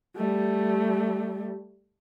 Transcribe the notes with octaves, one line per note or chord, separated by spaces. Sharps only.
G3 A3